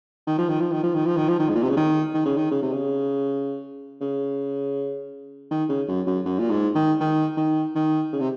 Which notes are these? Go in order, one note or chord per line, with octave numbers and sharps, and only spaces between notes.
D#3
F3
D#3
F3
D#3
F3
D#3
F3
D#3
F3
D#3
G#2
A#2
C3
C#3
D#3
D#3
C#3
D#3
C#3
C3
C#3
C#3
D#3
C#3
F#2
F#2
F#2
A#2
G#2
D#3
D#3
D#3
D#3
C#3
C3